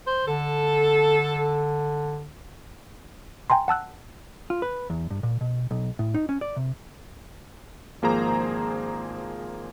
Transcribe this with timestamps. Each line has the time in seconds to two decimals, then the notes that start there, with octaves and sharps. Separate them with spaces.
0.07 C5
0.27 D3 A4
3.50 G5 G#5 A#5 C6
3.68 F#5 A5 E6 F#6
4.50 F4
4.62 B4
4.90 E2
5.11 G2
5.23 A#2
5.41 B2
5.71 B1
5.99 A2
6.14 D#4
6.29 C#4
6.41 D5
6.56 C3
8.02 G#1 F3 A#3 G#4 C5 A#5